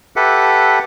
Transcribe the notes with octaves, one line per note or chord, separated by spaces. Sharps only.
G4 A4 B4 E5 F#5